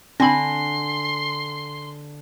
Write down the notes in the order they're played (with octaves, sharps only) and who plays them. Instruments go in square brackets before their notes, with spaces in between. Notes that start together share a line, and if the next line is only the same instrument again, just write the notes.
[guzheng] D3 [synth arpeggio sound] C4 B5 [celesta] G#5 A#6 [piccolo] C6